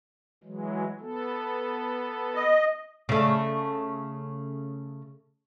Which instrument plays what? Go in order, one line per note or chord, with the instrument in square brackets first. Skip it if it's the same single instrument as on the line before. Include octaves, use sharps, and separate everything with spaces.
[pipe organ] E3 F#3 G#3
B3 A4
[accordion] D#5
[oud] C#3 A3